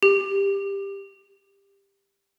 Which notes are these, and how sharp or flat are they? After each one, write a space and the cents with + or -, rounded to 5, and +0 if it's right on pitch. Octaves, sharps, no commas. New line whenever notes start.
G4 +15